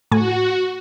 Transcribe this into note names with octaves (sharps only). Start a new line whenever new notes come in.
A2 F#4 G#5